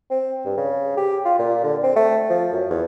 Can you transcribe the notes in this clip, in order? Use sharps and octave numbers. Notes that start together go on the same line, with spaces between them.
C4
G2
C#3
G4
F4
A#2
D3
C4
A3
F3
F#2
E2